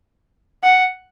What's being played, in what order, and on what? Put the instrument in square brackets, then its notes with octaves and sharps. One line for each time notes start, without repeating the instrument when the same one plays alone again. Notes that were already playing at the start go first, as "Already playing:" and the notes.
[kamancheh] F#5